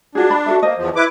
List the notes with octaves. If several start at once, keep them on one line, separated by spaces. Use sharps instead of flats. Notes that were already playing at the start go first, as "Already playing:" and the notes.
D4 F4 F#4 G#4
D5 B5
F#4 A4 E5
A#3 C5 D#5
E2 F3
E4 B4 D6